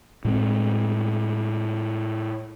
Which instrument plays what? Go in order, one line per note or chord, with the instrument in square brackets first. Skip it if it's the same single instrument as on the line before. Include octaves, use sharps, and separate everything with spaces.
[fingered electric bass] A2 G#3 C4